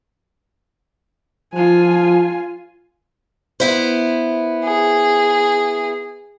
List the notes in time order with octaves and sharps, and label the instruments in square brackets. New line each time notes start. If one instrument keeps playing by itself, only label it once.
[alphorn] F3 [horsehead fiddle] F4 G#5
[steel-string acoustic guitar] B3 E4 C5
[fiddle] G#4